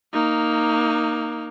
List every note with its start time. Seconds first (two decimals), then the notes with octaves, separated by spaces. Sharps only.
0.14 A#3 D#4